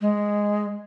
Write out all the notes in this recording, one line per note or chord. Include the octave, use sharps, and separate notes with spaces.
G#3